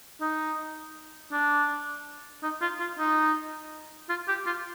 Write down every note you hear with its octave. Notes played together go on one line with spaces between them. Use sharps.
D#4
D4
D#4
F4
F4
D#4
F4
G4
F4